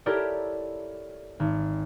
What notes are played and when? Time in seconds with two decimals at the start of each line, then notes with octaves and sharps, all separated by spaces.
0.06 E4 G4 A4 A#4 C#5 D5
1.40 G#1